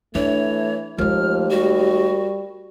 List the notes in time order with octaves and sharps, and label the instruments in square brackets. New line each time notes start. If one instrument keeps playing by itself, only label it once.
[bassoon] E3 [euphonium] A3 [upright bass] D4 [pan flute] C#5
[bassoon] D#2 [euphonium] F3 [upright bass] G#3 A3 [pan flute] F6
[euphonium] G3 [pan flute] F#4